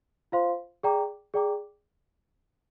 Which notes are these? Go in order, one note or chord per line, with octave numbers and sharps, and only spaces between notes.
F4 C5 F5 C6
G#4 D5 G5 A#5 D6
G#4 D5 G5 A#5 D6